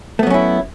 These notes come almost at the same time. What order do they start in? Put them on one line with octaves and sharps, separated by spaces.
A3 B3 F#3 C#4 E4